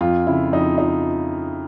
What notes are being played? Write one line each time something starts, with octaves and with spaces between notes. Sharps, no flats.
F2 F4
C#3 E4
F2 D#4
D#4